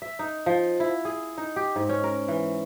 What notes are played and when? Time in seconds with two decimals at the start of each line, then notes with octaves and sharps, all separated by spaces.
0.02 E5
0.19 D#4
0.46 F3
0.80 E4
1.05 G#4
1.38 D#4
1.56 G4
1.76 G#2
1.89 C#4
2.04 A#4
2.28 E3